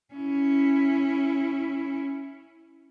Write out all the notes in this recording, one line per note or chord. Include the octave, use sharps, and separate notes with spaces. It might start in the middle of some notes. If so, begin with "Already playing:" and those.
C#4 E4